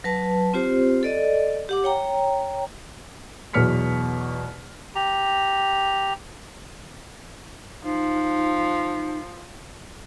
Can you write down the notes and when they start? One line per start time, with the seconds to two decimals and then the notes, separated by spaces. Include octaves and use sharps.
0.04 F#3 B4 A5
0.54 C4 F4 G4 C5
1.03 A4 D5 D#5
1.69 G4 F#5 D6
1.84 C#5 G5 A#5
3.53 E2 B2 F#3 F6 B6 C#7
4.95 G4 A#5
7.84 F3 D#4